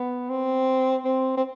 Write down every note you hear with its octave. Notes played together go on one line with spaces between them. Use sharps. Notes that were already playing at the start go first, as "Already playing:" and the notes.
Already playing: B3
C4
C4
C4